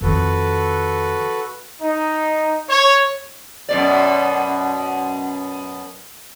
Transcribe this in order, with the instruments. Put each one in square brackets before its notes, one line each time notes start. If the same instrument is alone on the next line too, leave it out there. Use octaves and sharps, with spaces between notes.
[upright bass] F2 D#3 [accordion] F#4 A4 B4
[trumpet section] D#4
C#5
[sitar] F#2 B2 D5